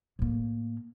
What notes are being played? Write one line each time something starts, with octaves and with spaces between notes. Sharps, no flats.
A2 A#3